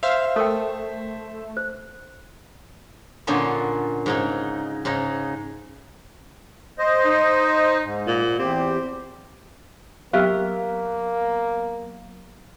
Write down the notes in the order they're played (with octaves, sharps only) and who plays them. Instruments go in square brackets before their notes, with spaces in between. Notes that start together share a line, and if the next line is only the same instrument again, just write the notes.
[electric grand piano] C5 E5 [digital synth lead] F5
[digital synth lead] A3 [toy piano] A4 A#4 G5
[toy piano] C5
[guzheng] A#2 D3 B3 C#4 D#4 F4
G#2 C#3 D#4
G#2 C#3 D#4
[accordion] C5 D#5
[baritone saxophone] D#4
[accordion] G#2
[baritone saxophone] A#2
[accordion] E2 G4 [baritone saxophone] C4
[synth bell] F#3 B3 [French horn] A#3 [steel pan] G4 E5 F5